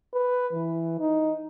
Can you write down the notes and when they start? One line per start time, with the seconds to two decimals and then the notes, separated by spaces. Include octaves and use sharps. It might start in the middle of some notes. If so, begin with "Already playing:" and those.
0.14 B4
0.53 E3
1.00 D#4